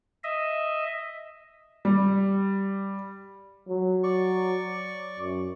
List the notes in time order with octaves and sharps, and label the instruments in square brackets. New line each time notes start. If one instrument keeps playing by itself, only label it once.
[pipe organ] D#5 E5
[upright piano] G3
[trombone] F#3
[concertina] D5 C#6
[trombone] F#2